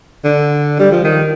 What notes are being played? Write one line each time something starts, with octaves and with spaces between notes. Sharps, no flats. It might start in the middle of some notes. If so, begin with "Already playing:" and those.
D3
G3
F3
D#3